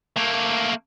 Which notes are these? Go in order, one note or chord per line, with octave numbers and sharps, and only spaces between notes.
A3 A#3